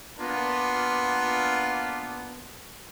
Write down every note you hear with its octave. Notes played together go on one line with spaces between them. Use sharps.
A#3 B3 D4 F4